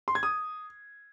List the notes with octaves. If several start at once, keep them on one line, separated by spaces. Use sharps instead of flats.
C6
G#6
D#6